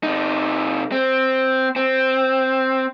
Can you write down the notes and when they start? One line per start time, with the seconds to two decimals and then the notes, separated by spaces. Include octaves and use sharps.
0.03 C3 D#4
0.92 C4
1.76 C4